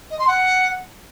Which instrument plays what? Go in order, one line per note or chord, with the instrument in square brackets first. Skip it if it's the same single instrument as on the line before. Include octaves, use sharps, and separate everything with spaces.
[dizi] D#5
C6
F#5